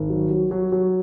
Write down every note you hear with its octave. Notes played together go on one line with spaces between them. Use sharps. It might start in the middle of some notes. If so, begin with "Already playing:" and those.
Already playing: G#1
F#3
F#3
F#3
F#3